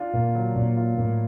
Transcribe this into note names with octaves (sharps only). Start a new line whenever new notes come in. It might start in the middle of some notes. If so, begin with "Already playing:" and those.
Already playing: D4 F4
A#2 A#3
F#3
A#2 D4
F4
A2 A#3